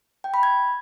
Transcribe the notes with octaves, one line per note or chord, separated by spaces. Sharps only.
G5
B5
G#6